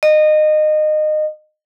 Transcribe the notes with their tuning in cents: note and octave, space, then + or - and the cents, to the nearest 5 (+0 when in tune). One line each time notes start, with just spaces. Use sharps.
D#5 -25